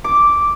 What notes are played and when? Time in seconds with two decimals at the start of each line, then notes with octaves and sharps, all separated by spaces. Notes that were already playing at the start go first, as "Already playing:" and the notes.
0.04 D6